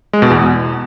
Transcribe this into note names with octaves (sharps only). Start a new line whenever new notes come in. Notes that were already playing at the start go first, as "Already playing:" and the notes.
G#3
B2
E2